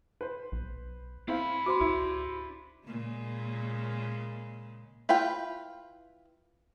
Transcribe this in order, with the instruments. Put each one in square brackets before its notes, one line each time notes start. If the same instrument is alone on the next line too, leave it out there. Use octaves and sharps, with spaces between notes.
[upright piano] B4 C5
[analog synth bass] B1
[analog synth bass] C4 [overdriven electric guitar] D4 B5 [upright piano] E4 C5 F5
[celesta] F#4 C5 C6 [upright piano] D6
[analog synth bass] C#2 [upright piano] E4
[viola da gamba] A#2 C#3 G#3
[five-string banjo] E4 F4 B4 G5